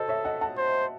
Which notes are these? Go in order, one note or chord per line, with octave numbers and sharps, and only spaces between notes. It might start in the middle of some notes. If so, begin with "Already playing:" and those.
Already playing: F#4 A4 C5 D#5
C#5 E5
D#5 F#5
F#5 A5
C5